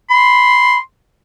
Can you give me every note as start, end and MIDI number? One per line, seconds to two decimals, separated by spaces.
0.10 0.78 83
0.10 0.79 84